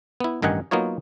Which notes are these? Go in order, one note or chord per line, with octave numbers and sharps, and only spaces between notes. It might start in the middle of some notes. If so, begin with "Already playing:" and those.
B3 E4
A1 G2 D#3 D#4 F#5 G#5
F#3 A#3 B3 D#4 F4 C#5